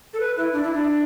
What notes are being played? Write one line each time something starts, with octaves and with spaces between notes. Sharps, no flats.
A4
B4
E4
D4
E4
D4